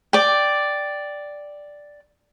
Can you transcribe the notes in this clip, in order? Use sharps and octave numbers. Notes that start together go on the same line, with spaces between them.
D5 G5